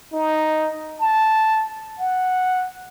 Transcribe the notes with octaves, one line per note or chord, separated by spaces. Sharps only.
D#4
A5
F#5